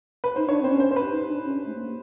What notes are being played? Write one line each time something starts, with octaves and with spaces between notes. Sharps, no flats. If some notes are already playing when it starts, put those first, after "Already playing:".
B4
D#4 C5
D4 C#5
C4 C5
C#4
C5
C5
B4
D#4
D4
C#4
A3
A#3